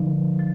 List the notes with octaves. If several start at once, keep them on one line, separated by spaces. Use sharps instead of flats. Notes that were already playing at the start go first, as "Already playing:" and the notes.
Already playing: D3 F3 D#4
F3